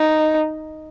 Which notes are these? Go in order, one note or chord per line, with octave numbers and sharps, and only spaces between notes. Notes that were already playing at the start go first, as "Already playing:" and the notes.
Already playing: D#4